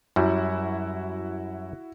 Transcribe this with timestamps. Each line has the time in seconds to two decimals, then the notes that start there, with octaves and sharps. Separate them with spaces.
0.16 F#2 G3 E4 F#4